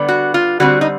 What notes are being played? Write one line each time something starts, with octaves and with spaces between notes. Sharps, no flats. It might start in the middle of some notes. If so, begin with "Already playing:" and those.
Already playing: D3 G3 B3
F#4
F4
D3 G3 C4 F#4
D#4